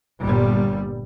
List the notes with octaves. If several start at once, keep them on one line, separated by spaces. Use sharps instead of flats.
G1 A#2 G3